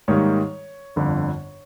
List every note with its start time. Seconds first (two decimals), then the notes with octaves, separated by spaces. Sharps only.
0.08 G#2 D#3 G3 A#3 C#5
0.96 G1 F2 D3